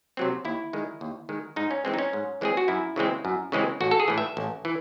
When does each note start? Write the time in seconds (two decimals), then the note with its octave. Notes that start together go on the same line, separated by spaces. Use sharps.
0.17 C3 F#3 C4
0.45 D#2 E4
0.73 D#3 G#3
1.01 D#2
1.29 D#3 G#3
1.56 G#2 D#4
1.71 C#4
1.85 E3 G#3 C4
1.94 D#4
1.99 C#4
2.13 G#2
2.41 E3 G#3 C4 G#4
2.57 F#4
2.68 F#2 E4
2.96 C#3 E3 G#3 C4
3.25 F#2
3.52 C#3 E3 G#3 C4
3.80 A1 F#4
3.91 A4
4.00 G#4
4.08 A2 E3
4.18 E5
4.37 A1
4.65 E3